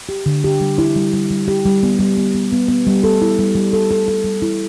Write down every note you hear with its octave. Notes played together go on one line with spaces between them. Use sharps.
G4
D3
G4
G3
E4
G3
G3
G3
G4
G3
B3
G3
B3
B3
B3
B3
G3
A4
E4
G3
G3
A4
A4
A4
G3
E4